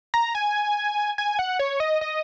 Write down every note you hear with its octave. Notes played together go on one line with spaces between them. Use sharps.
A#5
G#5
G#5
F#5
C#5
D#5
D#5